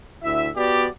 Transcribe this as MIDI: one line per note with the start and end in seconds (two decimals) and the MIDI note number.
0.24 0.49 38
0.24 0.49 64
0.24 0.49 76
0.56 0.87 59
0.56 0.87 66
0.56 0.87 67
0.56 0.87 74